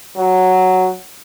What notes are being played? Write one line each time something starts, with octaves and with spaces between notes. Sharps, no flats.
F#3